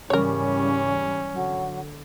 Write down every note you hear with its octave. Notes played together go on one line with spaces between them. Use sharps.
G#2 C#3 E3 G3 C#4 A#4 C#5
D3 F#3